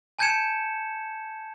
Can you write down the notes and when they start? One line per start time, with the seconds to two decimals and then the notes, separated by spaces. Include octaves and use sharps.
0.19 G#5 A5 G6 G#6 C#7 E7